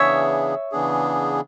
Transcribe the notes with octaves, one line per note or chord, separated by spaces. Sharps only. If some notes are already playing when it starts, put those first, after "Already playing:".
Already playing: C#3 E3 B3 D4 G#4 C#5 E5
C#3 E3 B3 D4 G#4